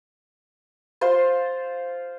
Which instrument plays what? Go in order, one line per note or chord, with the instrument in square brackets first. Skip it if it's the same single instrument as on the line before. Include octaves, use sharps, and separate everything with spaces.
[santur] F4 C5 C6